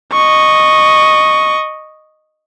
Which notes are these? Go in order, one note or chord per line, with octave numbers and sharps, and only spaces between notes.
D#5 C#6